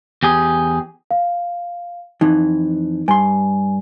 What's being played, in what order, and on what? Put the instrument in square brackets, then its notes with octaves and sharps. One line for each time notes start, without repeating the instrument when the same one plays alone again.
[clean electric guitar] E2 G4 G#4
[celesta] F5
[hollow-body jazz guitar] F2 E3 [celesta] D#4
[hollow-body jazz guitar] G2 C6 [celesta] G#5